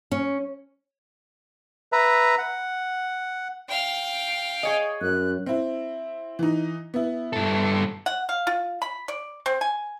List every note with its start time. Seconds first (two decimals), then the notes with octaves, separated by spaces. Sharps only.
0.11 C#4
1.92 B4 E5 A#5
2.38 F#5
3.69 F5 G5
4.63 G#4 C#5 D#5 G#5
5.02 F#2 F#6
5.46 C4 E4
6.39 E3 D#4
6.94 B3 E4
7.33 G2 A4
8.06 F#5
8.29 F5
8.47 F4
8.82 B5
9.08 D5
9.46 C4
9.61 G#5